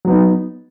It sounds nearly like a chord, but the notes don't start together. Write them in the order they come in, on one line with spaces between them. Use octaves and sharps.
F#3 B3 D#4